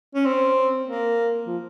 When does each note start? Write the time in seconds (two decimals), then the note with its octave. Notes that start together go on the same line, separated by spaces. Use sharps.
0.15 C#4
0.26 C4
0.86 A#3
1.47 F3